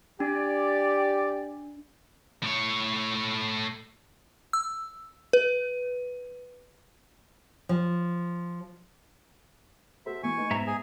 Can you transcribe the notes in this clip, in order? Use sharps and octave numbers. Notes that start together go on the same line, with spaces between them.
D4 G4 D5
A2 C#5
E6
B4
F3
F#4 A4 C5 E5
E3 A#3 G#5 C#6
A3 D#4 B4
G#2 B3 E5 A#5
G#4 G#5